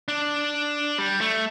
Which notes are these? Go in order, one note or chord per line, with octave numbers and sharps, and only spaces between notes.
D4
G3
A3